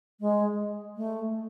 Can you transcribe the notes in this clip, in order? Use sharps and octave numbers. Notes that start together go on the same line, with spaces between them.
G#3
A3